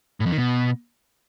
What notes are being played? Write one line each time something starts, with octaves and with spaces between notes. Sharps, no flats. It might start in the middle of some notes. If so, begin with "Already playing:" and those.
A2
F2
D#3
B2